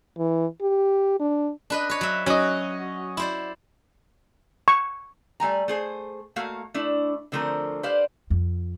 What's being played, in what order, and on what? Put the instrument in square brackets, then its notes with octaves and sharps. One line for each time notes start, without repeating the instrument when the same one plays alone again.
[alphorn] E3
G4
D4
[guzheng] D4 B4 D#5
B4 C#5
F#3 E5
[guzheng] F#3 F#4 [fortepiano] C#4 D#5
[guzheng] E4 C5 D5
[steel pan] C#6
[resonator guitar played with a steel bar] G3 A3 G#5 A#5
A3 G#4 C5
A3 A#3 F#4 F5
A3 D4 E4
D3 F3 A3 C4 A#4
G4 B4 C5 D5 F5
[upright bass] F2